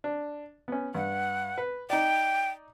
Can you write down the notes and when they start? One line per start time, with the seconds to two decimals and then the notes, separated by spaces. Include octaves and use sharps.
0.04 D4
0.68 B3 C#4
0.95 G2 F#5
1.58 B4
1.90 D#4 D5 G5